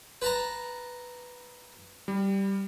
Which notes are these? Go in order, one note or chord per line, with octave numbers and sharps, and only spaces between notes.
B4 A5 A#5
G3